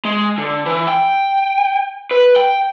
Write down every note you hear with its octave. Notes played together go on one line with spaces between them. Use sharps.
G#3
D3
E3
G5
B4
G5